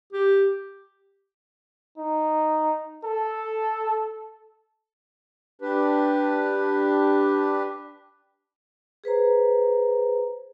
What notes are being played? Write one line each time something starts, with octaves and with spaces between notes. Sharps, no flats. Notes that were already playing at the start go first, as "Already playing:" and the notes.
G4
D#4
A4
D4 G4 B4
G#4 B4 C5 A#5